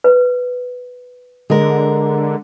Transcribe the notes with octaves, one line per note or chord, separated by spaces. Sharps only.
B4
D3 G#3 A#4